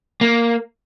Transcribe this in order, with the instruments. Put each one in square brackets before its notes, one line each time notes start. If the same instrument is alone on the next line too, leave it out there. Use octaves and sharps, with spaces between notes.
[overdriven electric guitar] A#3